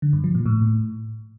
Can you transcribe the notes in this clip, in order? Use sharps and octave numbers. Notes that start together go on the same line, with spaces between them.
D3
G2
F3
A#2
A2